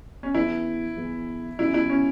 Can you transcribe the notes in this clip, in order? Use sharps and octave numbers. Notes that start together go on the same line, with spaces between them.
C#4
E3 B3 E4 G#4
E3 B3 G#4
C#3 G#3 B3 E4 F#4
E4
C#4